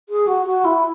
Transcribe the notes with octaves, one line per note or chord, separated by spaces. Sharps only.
G#4
F#4
F#4
E4